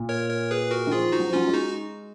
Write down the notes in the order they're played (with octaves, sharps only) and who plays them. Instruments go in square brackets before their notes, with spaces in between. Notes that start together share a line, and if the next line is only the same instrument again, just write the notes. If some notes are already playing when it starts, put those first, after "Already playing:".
Already playing: [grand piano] A#2
[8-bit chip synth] A#4 C#5
A#4 C#5
G#4 B4
F#4 A#4
[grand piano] D#3
[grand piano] F3 [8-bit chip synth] F4 G#4
[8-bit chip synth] D#4 F#4
[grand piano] F#3
F3
[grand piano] F#3 [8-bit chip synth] C#4 F4
[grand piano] G#3
[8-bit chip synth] D#4 F#4